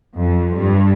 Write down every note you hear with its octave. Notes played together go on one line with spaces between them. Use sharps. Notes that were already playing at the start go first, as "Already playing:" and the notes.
F2
G2